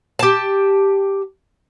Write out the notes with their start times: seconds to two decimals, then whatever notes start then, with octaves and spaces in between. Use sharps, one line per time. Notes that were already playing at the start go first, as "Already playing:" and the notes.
0.19 G4 A5